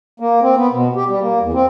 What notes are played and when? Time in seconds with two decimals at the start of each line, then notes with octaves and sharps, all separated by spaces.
0.20 A#3
0.42 C4
0.57 B3
0.72 B2
0.96 G4
1.09 G3
1.21 A#3
1.41 E2
1.54 C4